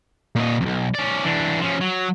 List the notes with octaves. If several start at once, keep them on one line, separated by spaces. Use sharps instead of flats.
A#2 D#5
B1 F2
C#4 D5
E3 D4
F3 C#4
F#3